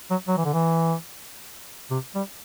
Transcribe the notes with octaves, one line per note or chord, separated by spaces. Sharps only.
F#3
F#3
E3
D3
E3
C3
G3